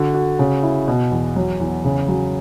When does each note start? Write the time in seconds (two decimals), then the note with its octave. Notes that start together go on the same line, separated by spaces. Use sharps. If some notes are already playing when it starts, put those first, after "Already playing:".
Already playing: D3 F#4
0.14 F#4
0.39 C#3
0.63 E4
0.88 B2
1.12 E2
1.36 F#3
1.60 E2
1.85 C#3
2.08 F#3